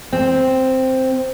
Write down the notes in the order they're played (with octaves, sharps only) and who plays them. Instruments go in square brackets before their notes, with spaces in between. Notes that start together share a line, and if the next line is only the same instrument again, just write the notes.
[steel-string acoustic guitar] C4